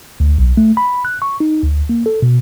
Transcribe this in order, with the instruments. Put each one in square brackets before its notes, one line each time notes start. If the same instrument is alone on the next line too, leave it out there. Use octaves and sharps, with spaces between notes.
[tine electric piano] D2
B1
A3
B5
F#6
C#6
D#4
D2
A#3
A4
B2